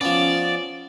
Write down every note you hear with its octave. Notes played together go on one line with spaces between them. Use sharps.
F3 B3 C#4 D5